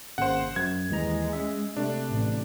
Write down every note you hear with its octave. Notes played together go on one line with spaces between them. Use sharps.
G#1 C#3 A#3 C5 F#5
F#2 G#6
D#2 E3 G#3 A#5
C#4 E5
C3 A3 D4
A1